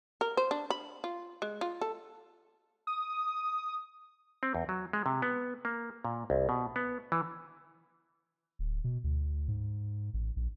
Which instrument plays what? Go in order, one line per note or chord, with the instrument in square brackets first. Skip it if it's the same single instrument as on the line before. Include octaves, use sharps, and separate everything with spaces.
[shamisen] A#4
C5
D4
B5
F4
G#3
F4
A4
[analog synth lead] D#6
[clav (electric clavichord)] C4
E2
F#3
G#3
C3
B3
A#3
A#2
C2
B2
B3
E3
[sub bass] D1
B2
D2
G#2
A1
A#1